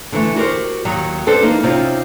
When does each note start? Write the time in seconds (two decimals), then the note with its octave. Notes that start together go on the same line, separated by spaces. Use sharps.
0.12 D3 E3 F#3 A3
0.36 F#4 G4 A#4 C5
0.85 D#2 D#3 F#3
1.26 C4 D4 A4 B4 C5
1.43 E3 A#3 D#4
1.63 C3 C4 C#4 D#4 F4